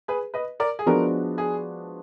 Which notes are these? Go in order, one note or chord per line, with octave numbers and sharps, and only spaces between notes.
G#4 B4
B4 D#5
A#4 D5
G#4
F3 G#3 B3 D4 F#4 A#4
G#4